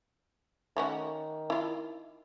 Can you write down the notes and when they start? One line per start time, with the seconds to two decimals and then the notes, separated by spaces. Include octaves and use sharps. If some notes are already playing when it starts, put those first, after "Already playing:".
0.77 D#3 A3 C#4 F#4
1.50 E4 F4